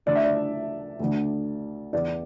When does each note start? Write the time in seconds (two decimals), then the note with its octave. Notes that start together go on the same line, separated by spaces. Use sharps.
0.06 D2 D3 D5
0.15 E5
0.24 D5
1.00 D2 D3
1.93 E2 E3 D5